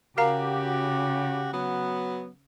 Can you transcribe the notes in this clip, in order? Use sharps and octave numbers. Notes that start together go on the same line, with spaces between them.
C#3 F#4 G4 A#4 F5 A#5
F#3 B3